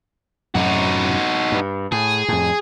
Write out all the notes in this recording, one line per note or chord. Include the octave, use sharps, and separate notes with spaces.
F#2 A2 C3 D#4 F#4
G2
A2 G#4
F2 A2